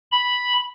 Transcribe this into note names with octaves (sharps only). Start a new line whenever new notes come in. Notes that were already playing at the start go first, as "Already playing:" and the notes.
B5